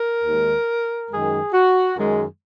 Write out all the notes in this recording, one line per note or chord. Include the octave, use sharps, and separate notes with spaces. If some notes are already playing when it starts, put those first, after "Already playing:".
Already playing: A#4
D#2 D#3 G#3
F#2 D#3 G#3 G#4
F#4
F#2 D#3 G#3